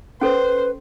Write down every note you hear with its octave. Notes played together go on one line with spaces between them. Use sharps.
C#4 A4 B4 C5